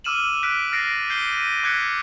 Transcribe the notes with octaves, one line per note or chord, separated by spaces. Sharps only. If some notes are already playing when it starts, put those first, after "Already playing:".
D6 E6 F6 D#7 E7 F#7
F6 F#6 B6 D7
F6 A6 A#6 C7 D7
G6 C7 D7 G7
D#7
D6 F#6 G#6 B6 C#7